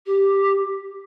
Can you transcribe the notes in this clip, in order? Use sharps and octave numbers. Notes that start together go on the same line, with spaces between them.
G4